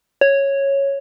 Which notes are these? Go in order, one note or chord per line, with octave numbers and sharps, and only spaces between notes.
C#5